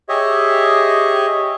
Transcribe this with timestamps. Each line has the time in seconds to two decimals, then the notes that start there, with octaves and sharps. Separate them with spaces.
0.09 G4 G#4 C#5 D#5 E5